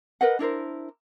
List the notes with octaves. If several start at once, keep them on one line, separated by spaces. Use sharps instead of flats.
A#4 B4 D#5 F#5
D4 E4 A#4 C5